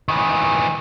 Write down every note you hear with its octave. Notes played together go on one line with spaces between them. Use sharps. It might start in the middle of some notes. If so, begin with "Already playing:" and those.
D#3 E3